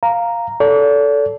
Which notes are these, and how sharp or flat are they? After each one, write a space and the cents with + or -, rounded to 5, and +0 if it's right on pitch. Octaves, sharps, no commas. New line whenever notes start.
F5 +0 A#5 +0
A4 +0 D5 -40